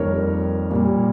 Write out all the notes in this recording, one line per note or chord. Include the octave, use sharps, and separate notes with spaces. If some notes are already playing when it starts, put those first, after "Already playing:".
Already playing: F2 D#3 G3 A#3 A#4 C#5
A#2 G3 A#3